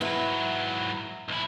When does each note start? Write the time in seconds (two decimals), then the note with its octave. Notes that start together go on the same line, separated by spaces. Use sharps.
0.01 G#2 F#3 B3 E4
1.29 B1 E4